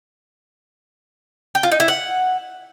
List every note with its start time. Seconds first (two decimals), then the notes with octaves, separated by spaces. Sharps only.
1.55 G5
1.63 F4
1.72 D#4
1.80 E4
1.88 F#5